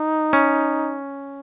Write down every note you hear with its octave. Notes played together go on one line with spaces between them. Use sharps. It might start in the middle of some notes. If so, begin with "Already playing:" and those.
Already playing: D#4
C#4